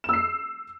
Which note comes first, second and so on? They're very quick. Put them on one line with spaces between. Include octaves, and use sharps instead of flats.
E7 E6 C7